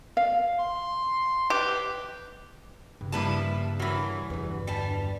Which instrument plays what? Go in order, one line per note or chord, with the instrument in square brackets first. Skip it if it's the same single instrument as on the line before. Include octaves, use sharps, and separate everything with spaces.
[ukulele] F5
[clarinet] C6
[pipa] G4 [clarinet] B4
[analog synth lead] G2 [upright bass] C#3
[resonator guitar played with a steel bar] F3 B4 A5 [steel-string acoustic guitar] G3 A#3 E4
[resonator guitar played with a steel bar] E3 F#3 [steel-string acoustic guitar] A#4 E5
[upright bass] E2 D3 [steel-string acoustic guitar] B4
[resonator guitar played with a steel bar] G3 A5